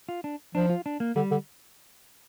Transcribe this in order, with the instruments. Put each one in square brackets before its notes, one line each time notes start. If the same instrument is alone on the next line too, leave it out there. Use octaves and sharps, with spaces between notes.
[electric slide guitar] F4
D4
[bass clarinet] F3 [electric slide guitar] D4
[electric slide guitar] F4
D4
A#3
[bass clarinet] D3 [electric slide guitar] G3
[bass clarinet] D3